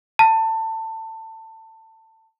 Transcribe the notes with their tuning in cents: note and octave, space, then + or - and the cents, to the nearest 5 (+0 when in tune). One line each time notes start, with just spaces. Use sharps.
A5 +25